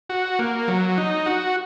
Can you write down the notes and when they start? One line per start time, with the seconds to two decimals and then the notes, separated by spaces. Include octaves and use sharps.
0.10 F#4
0.39 A#3
0.68 F#3
0.98 D#4
1.26 F#4